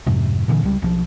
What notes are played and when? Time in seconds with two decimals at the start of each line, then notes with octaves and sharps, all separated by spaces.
0.06 F2 G#2 C3
0.48 A#2 D3 E3
0.63 C#2 G3
0.82 B1 D#3 F3